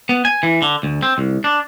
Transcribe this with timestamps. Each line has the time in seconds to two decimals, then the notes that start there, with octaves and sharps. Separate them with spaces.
0.09 B3
0.25 G#5
0.43 E3
0.62 D3
0.83 D2
1.03 C4
1.18 C2
1.44 D4